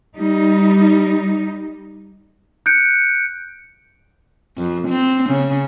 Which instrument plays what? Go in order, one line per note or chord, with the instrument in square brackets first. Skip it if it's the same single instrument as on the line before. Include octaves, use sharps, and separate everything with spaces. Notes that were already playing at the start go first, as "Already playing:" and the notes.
[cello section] G3 D#4
[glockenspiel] F#6 G6 C#7 D7
[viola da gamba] F2
C4
C#3